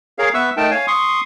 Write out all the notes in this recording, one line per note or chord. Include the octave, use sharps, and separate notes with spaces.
G#4 A#4 C#5 F5
B3 B4 E5 C#6 E6
A3 D#4 A#4 G5 A5
C#5 F5 G#5
C6 C#6 D#6